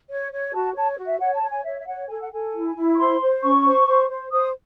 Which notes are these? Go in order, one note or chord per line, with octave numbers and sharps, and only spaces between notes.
C#5
C#5
F#4 A5
C#5 A5
F#4
E5
C#5 F#5
A5
C#5
G#5
C#5 E5
E5
C#5 F#5
A4 G#5
F#5
A4 G#5
E4
E4
C#6
C5 C6
C5
C#4 C#6
C5
C5
C5
C5 D#6